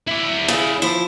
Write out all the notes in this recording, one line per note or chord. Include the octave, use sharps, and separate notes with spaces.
E4 D5
C#3
F3 E4